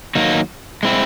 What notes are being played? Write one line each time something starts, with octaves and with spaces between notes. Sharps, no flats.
D#3 F#3 A#3 D#4
G#3 C4 E4